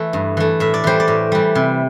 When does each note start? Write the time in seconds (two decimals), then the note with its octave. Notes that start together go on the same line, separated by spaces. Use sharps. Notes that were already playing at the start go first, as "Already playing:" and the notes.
Already playing: E3 A3 A4
0.13 G2
0.37 E3 A3
0.60 A2 E5
0.74 D5
0.84 E3 G3 C5
1.00 D5
1.08 A2
1.32 E3 G3
1.55 C3